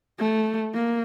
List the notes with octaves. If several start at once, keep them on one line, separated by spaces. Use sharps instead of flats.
A3
A#3